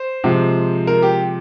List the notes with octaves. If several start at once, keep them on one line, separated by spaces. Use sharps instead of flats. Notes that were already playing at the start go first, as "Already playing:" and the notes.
Already playing: C5
C3 F3 G#3
A#4
G4